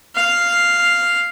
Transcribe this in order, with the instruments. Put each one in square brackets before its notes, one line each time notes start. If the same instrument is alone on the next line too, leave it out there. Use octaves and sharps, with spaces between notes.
[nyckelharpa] F5